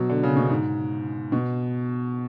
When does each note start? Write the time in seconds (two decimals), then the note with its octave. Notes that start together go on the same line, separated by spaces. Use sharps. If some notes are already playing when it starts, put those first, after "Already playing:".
Already playing: B2 F#3
0.10 D3
0.23 C#3
0.37 B2
0.50 G#2
1.32 B2